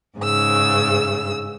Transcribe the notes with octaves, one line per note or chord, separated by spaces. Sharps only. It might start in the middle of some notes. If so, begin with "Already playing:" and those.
G#2 C#3 E6